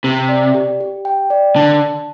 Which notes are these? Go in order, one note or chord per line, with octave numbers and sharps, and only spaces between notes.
C3 G4
D5
G4
G4
G5
D5
D3 A5
A5